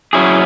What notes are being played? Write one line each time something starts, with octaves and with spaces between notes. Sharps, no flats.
F#3 C#4 E4 G#4